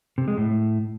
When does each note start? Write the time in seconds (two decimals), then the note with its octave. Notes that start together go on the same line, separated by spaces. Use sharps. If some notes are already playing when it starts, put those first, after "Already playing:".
0.18 C3
0.28 G#3
0.37 A2